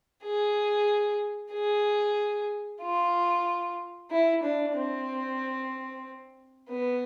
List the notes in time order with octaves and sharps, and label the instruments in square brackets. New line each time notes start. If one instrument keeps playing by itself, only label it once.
[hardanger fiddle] G#4
G#4
F4
E4
D4
C4
B3